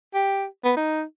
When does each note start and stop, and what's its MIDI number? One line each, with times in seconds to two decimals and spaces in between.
0.14 0.45 67
0.64 0.73 59
0.76 1.02 63